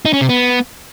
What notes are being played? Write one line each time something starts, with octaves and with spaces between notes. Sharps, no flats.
D#4
C#4
C3
B3